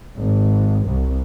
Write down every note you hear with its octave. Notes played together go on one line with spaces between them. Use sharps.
G#1
C2